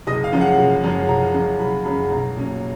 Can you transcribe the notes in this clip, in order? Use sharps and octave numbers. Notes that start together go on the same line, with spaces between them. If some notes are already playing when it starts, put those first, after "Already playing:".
F#1 D#5
F5
F#2 F3 G#3 C#4
F#5
F#1
F#2 F3 G#3 C#4
F#1 A#5
F#2 F3 G#3 C#4
F#1 B5
F#2 F3 G#3 C#4 B5
B1 A#5
A#2 F#3 C#4